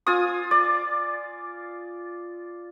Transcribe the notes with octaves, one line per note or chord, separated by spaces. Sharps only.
F4 G#5 D#6
D5